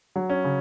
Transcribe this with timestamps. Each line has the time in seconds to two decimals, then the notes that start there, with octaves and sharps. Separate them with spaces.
0.16 F#3
0.30 C#4
0.44 C#3